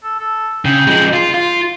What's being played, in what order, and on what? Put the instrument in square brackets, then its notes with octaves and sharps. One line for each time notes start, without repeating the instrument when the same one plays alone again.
[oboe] A4
A4
[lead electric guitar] C#3 [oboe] G5
[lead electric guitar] F3 G#3
[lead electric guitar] F4 [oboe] C6
[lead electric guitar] F4